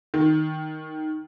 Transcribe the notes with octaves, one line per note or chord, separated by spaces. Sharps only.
D#3